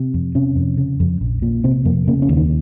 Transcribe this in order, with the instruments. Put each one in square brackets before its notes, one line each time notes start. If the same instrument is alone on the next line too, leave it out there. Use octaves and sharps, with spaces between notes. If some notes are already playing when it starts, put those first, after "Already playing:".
Already playing: [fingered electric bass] C3
F2
C3 C#4
F2
C#3
F2
A#1
A#2
C3 C4
F2 A#3
C#3 A#3
C#4
D#2
D#3